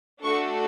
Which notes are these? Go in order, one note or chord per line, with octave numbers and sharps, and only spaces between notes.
A3 D4 F#4 A4 C#6